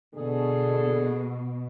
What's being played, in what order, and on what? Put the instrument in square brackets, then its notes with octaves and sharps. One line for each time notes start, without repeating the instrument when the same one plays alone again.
[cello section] B2 [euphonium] D3 [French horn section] G#4 A4